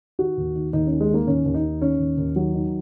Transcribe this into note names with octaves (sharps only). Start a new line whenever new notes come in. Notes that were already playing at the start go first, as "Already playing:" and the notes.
D#3 F#4
D#2
D#3
D#2 D#4
D#3 C#4
G#3
D#3 A#3
D#2 C#4
D#2
D#4
D#3
D#3 C#4
D#2
D#2
D#3 F#3
D#3